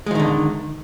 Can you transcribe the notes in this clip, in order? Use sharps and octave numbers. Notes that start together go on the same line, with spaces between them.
D3 D#3 F3 G#3